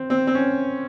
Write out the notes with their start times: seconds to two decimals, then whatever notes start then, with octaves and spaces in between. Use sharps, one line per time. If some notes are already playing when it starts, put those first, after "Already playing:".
Already playing: C4
0.10 C4
0.27 C4
0.35 C#4